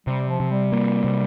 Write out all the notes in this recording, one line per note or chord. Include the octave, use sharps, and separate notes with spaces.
C3 G3
F3
C3
G3
A#3
C3